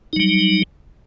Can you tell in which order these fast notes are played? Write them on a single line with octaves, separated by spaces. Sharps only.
D#4 F#3 G3